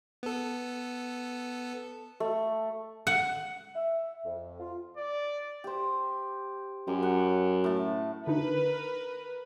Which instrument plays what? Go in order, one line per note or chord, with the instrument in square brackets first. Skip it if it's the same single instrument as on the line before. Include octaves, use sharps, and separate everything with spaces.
[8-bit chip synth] B3 A4
[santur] A3
[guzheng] F#5
[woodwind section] E5
F2
F4
[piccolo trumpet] D5
[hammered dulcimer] G4 C5
[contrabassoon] F#2 [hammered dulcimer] G4
[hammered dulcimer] F#5
A2 A5
[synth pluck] D3 D4 D#4 [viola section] A#4 B4